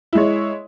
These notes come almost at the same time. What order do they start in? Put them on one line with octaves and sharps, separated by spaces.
E4 G#3 C#5